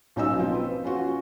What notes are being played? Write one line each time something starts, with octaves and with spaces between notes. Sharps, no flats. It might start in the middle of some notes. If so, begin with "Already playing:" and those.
B1 C#4 D#4 D#5 E6
F3 C4
B4
C#4 F4 F#4